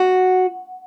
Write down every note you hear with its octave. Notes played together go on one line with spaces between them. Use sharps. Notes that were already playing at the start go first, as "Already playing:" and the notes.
Already playing: F#4